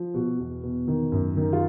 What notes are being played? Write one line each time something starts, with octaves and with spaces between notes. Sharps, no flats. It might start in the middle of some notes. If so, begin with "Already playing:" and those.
Already playing: F3
B2 F#4
E2
B2
D#3
F#2
D#3
F4